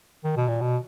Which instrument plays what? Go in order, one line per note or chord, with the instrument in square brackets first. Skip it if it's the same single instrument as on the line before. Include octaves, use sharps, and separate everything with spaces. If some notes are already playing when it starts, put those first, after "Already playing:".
[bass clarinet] D#3
B2
A#2
B2